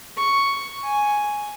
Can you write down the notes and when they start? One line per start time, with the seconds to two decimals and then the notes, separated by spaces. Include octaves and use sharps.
0.17 C#6
0.84 G#5